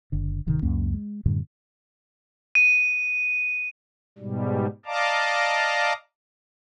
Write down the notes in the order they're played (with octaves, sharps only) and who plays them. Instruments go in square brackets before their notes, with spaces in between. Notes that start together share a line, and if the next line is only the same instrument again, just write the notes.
[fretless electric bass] F#1 D3
D1 C3 D#3
C#2 F#2 A#3 C#4
G#3
F#2 A2 D3 G3
[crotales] D#7
[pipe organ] G#2 B2 G3
D5 D#5 F5 A5 A#5 D6